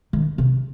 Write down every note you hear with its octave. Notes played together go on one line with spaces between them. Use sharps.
D#3
C3